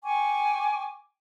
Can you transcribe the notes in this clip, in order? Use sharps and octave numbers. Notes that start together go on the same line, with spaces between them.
G5 G#5 C#6 D6